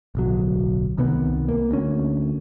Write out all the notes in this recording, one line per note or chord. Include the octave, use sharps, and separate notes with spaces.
D1 B1 F#3
C2 C3 D#3 B3
A#3
D2 C#4